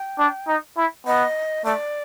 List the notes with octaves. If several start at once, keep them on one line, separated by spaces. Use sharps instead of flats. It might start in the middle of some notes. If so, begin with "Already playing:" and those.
Already playing: G5
D4
D#4
E4
B3 D#5
A3 D5